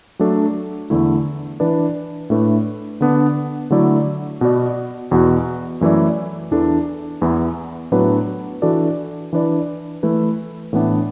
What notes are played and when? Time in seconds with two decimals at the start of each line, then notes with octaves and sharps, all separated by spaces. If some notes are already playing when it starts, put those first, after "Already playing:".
0.19 F#3 A3 D4 A4
0.90 E2 D3 A3 E4
1.60 E3 D4 B4 D5
2.30 A2 A3 D4 B4
3.01 D3 B3 D4
3.70 D3 F#3 A3 E4 D5
4.41 B2 B3 F#4 D5
5.11 E2 B2 B3 F#4
5.81 F#2 E3 A3 E4 D5
6.51 E2 E3 D4 A4
7.22 E2 E3 B3
7.92 A2 F#3 B3 D4 B4
8.62 E3 D4 F#4 A4 D5
9.33 E3 D4 B4 D5
10.03 E3 A3 E4 B4
10.73 A2 E3 B3 D4